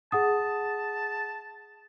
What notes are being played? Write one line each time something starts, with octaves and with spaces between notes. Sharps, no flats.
G#4 F#5 A5 D#6